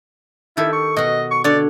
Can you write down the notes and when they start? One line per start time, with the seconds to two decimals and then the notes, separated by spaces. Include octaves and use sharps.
0.57 D#3 E4 G4 A4
0.73 C#6
0.96 B2 F#4 D#5
1.31 C#6
1.44 D3 D4 C#5 D5